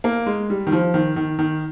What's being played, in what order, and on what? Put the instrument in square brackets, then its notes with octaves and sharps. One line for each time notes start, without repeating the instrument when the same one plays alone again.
[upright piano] A#3
G#3
G3
D#3
F3
D#3
D#3
D#3